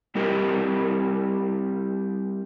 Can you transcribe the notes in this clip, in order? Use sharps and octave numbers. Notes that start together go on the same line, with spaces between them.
G3 C4 E4 G4 A#4 D#5